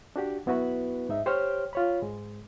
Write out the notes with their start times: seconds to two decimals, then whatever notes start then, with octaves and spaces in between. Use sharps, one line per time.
0.16 D4 F#4 G4
0.46 F#2 B3 E4 F#4 B4 B5
1.09 G#2 D#4 E5
1.26 G4 C5 C#5 G5 C6 F6
1.73 F4 C#5 B5
2.02 G#2 G#3